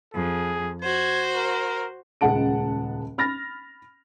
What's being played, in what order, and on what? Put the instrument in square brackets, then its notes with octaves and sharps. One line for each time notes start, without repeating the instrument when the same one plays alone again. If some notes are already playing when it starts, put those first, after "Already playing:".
[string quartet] F2 [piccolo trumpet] G#4
[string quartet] F#4 C5 [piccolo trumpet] G#6
[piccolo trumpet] A#4
[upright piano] D#1 C#2 G#3 F#5 A5 D7
B5 F6 A6 A#6